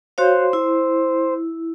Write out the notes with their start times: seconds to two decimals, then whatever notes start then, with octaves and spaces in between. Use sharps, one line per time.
0.18 F#4 C5 C#5 F5
0.53 E4